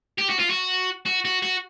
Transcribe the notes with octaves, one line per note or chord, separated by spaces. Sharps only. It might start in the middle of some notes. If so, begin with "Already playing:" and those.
G4
F#4
F4
F#4
F#4
F#4
F#4